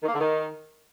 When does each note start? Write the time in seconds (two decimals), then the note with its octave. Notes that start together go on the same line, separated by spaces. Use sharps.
0.03 D#3
0.08 A#3
0.14 D3
0.19 D#3